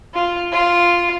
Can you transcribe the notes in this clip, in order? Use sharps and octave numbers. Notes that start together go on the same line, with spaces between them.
F4
F4